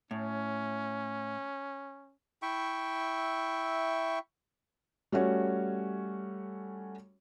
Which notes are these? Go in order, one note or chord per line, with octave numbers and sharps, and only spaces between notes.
A2 C#4
E4 E5 G5 C#6
G3 A3 C#4 F#4 C#5